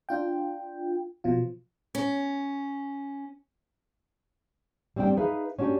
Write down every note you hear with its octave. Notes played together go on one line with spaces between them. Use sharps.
D4 F4 G5
B2 F3 F4
C#4
G3 C4 D4 D5 G5
D#4 G#4 B4 E5 F5
C#4 D4 F#4 G4